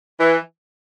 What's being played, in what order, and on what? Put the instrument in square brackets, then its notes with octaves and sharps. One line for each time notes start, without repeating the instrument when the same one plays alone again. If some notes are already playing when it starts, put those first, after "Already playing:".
[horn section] E3